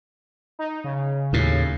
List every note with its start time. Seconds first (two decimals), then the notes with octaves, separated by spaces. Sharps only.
0.59 D#4
0.84 C#3
1.33 D#2 A2